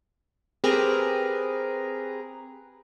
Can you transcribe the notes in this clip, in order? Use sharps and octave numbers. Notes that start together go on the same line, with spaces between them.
C4 G4 G#4 A#4 B4 A#5